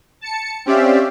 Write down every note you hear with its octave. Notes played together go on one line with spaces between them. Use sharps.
A5 C#7
C4 C#4 G4 D5 E5 F5